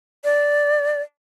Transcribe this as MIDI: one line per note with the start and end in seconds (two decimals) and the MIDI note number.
0.24 1.01 74